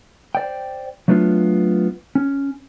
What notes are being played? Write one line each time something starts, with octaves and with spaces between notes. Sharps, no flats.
C5 D5 G5
F#3 A3 B3 D4 F4
C#4